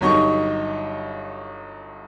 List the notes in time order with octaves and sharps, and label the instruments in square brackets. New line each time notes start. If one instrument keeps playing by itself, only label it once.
[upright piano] G1 G2 F#3 D#4 D#5 C#6